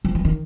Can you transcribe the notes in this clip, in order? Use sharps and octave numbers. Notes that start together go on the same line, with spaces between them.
F3
E3
D#3